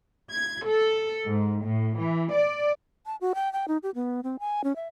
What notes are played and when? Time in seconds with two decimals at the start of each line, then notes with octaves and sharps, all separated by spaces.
0.31 G#6
0.67 A4
1.24 G#2
1.63 A2
1.97 E3
2.31 D5
3.06 A5
3.21 F#4
3.35 G5
3.53 G5
3.68 D#4
3.83 G4
3.95 B3
4.24 C4
4.40 G#5
4.64 C#4
4.76 E5